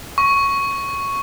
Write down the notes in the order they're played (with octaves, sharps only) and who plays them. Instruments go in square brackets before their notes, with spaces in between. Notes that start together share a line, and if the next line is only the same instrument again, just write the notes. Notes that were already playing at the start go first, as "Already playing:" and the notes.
[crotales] C#6